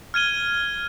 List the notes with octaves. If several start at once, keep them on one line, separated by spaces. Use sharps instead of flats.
F6 G#6 D#7 G7